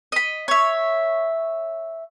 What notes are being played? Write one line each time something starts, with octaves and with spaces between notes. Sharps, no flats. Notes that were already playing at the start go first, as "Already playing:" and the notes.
D#5 B5
C#5 E5